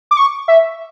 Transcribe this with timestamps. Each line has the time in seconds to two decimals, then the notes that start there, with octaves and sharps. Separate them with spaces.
0.11 D6
0.17 C#6
0.48 E5